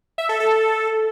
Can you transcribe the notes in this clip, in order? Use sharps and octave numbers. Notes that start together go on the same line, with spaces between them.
E5
A4
A4